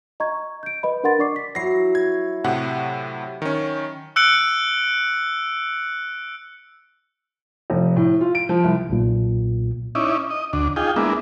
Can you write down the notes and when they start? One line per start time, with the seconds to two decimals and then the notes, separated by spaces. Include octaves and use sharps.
0.20 D#5 A#5 C#6 G#6
0.63 G6 D7
0.83 B4 D#5 B5
1.03 D4 A#4 F#5 C6 A6
1.19 D4 D5 C#6 D6 C7
1.36 B6
1.55 F#3 E4 A#6 C7
1.95 G#6
2.44 A2 C3 F#5
3.42 D#3 C#4
4.16 E6 F#6 C#7 D7 F#7
7.70 F1
7.96 A2
8.21 F4
8.35 D7
8.49 F3
8.64 C2
8.90 B1 A#2
9.95 C#4 D#4 E4 D5
10.30 D#5
10.53 D2 D4
10.76 D#4 F4 G#4 G5
10.96 G#3 A#3 B3 D4 E4